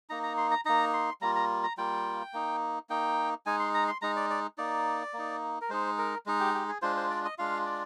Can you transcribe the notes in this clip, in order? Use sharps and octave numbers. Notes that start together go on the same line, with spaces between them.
A#3 D#4 A#5
A#5
C6
A#5
A#3 D#4 A#5
C6
G3 A#3 F4 A#5
A#5
A#5
G3 A#3 F4 G5
A#3 D#4
A#3 D#4 G5
G#3 D#4 G#5
C6
A#5
C6
G#3 D#4 A#5
D5
D5
A#3 D#4 D5
A#3 D#4
A#4
G#3 D#4 C5
A#4
G#3 D#4
G4
G4
G#4
G#3 D4 F4 C5
C5
D5
D#5
G#3 D4 F4 F5
D5